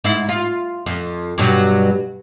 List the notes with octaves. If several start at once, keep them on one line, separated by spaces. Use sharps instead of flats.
G#2 E4
F4
F2
G2 B2 F#3